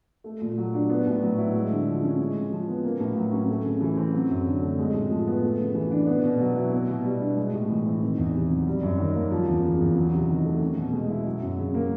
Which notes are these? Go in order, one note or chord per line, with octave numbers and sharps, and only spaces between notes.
A3
A#2
F#3
D4
B3
A2
F#3
E4
G#3
D3
F3
C#4
G#3
C#3
F3
B3
A#3
A2
F#3
C#4
A3
C#3
E3
C4
F#3
F#2
D3
A3
G#3
A2
F3
B3
A3
C#3
E3
D4
B3
B2
F#3
E4
B3
B2
G3
D4
G#3
A2
E3
C4
D#3
E2
C3
F#3
G3
F#2
D#3
A#3
F3
E2
C#3
E2
F#3
C3
D#3
A3
C#4
B2
G#3
E4
F#3
F#2
C#3
A#3